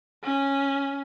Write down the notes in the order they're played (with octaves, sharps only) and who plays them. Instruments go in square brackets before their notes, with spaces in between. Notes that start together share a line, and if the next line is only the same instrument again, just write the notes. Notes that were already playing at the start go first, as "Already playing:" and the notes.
[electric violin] C#4